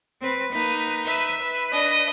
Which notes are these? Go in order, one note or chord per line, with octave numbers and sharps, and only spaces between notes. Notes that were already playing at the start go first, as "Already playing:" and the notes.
C4 B4
A#3 D#4 B4
B4 E5
B4
D4 D#5